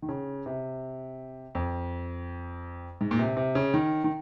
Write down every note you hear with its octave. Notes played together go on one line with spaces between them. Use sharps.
D#3
C#3
C3
F2
G#2
A#2
C3
C3
C#3
D#3
D#3